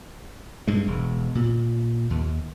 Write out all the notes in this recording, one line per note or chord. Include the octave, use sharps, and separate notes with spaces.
G2 G#3
E1
A#2
D#2